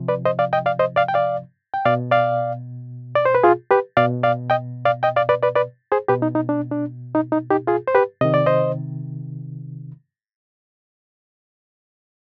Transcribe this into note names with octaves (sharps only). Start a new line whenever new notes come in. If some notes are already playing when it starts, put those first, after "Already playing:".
Already playing: C3 F3
B4 D5
C5 D#5
D5 F5
D#5 G5
D5 F5
C5 D#5
D5 F5
G5
D5 F5
G5
B2 D5 F5
D5 F5
D5
C5
B4
F4 G#4
G4 B4
B2 D5 F5
D5 F5
D#5 G5
D5 F5
D#5 G5
D5 F5
B4 D5
B4 D5
B4 D5
G#4 C5
B2 G4 B4
D#4
D#4
D4
D4
D#4
D#4
D#4 G4
F4 G#4
C5
G4 B4
C3 D#3 D#5
D5
C5 D#5